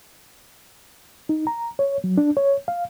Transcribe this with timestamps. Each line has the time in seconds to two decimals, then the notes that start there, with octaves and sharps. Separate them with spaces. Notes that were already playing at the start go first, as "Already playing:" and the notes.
1.29 D#4
1.47 A#5
1.79 C#5
2.04 F#3
2.17 D4
2.37 C#5
2.68 F5